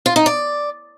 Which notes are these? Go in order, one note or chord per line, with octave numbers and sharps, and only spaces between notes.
F4
D#4
D5